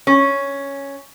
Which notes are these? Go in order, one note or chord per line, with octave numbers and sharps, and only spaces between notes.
C#4